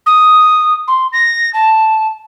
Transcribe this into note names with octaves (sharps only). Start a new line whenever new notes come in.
D#6
C6
A#6
A5